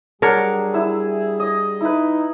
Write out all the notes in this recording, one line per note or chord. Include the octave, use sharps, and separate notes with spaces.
F#3 G3 D4 G#4 A#4 C#5
E4 E6
D#5
D#4 E4 B4